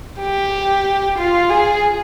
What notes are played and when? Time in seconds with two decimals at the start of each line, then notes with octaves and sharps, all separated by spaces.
0.20 G4
1.18 F4
1.50 G#4